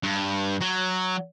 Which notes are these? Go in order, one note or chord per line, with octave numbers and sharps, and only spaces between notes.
G2
F#3